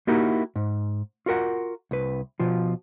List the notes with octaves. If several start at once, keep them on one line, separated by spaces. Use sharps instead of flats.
A#3 D#4 E4 F#4 G4 A#4
G#2
F4 F#4 A#4 F#5
C2 B4
B2 F3 F4